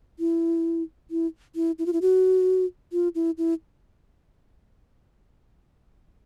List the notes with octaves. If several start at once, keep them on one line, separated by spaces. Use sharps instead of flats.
E4
E4
E4
E4
F4
E4
F#4
F4
E4
E4